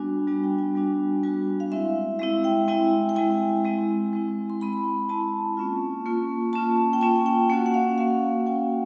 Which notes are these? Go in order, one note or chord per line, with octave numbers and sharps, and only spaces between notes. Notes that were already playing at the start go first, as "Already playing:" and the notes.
Already playing: G3 B3 D4 F#4 G#5
G3 B3 D4 F#4
G5
G#5
G3 B3 D4 F#4
G3 B3 D4 F#4 G#5
F5
G#3 C4 E4 E5
G#3 C4 E4 E5
G5
G#3 C4 E4 G#5
G5
G#3 C4 E4 G#5
G#3 C4 E4
G#3 C4 E4
C6
G#3 C4 E4 B5
G#3 C4 E4 A5
A#3 C#4 F4
A#3 C#4 F4
A#3 C#4 F4 A5
G5
A#3 C#4 F4 G#5
G5
A#3 C#4 F#4 F#5
F#5
F5
A#3 C#4 F#4 F5
A#3 C#4 F#4 G5